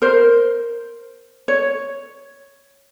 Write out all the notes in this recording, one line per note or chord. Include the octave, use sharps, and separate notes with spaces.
A#4 C5
C#5